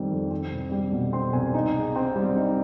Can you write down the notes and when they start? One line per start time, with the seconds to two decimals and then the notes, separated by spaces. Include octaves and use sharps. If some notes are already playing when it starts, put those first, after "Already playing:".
Already playing: F2 D#3 G3 C4
0.11 F2
0.31 C4
0.51 C2
0.72 G3
0.93 B2
1.13 C4 C6
1.33 C2 G#5
1.54 D#4
1.75 G#2
1.96 C4
2.16 G3
2.36 D#4